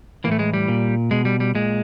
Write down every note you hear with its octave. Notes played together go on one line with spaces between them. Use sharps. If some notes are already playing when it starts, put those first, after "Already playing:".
A2 E3 A3 A#3
G#3
G3
A#2
B2 G#3
G3
G3
A#2 G#3